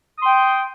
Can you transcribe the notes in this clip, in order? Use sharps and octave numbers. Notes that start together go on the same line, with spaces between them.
G5 C6 D#6